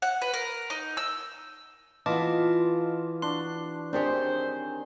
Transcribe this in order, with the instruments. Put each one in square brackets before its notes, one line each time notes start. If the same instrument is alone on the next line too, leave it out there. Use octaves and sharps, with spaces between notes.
[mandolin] F#5
B4
A#4
D#4
E6
[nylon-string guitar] E3 B3 [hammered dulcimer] F4 [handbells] D#5 A5 D6
[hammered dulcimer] D4 F#4 [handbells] C6
[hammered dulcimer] D#3 C4 G#4 [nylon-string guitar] D4 G4 C#5 [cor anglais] C5